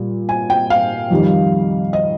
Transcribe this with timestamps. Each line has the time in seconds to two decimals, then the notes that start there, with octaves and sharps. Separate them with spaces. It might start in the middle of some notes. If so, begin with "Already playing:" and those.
Already playing: A#2 G3
0.29 G#5
0.50 G5
0.70 F5
1.10 F2 D#3 G3
1.93 D#5